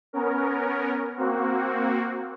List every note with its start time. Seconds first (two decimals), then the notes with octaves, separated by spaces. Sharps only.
0.13 B3 C#4 A#4
1.17 A#3 C4 F#4